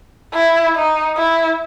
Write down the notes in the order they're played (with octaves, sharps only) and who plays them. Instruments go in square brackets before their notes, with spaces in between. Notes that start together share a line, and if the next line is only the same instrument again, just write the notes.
[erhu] E4
D#4
E4